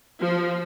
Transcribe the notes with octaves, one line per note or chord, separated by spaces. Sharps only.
F3